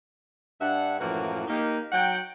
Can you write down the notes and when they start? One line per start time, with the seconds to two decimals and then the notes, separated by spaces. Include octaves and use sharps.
0.61 G2 D4 E5 F#5
1.00 F#2 A2 E3 F3 A#3 F#4
1.48 A#3 D#4 G4
1.92 F#3 F#5 G5